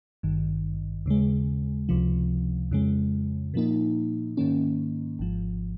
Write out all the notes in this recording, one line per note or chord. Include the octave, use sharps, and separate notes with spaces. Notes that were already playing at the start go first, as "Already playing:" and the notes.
G#1 G2 D#3
D#2 C#3 G#3
C#2 C3 F3
F2 C#3 G#3
A#2 F3 A#3 D#4
G#2 D#3 A#3 C#4
G#1 G#2 F3